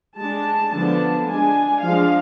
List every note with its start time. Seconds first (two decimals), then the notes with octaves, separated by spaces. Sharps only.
0.17 G#3 D4 A5
0.71 D3 F3 B3 D4 A5
1.27 G#3 D4 G#5
1.82 F3 G#3 D4 F5